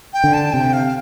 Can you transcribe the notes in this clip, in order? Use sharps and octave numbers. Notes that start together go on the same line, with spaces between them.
G5
D3
A5
C3 G5
F5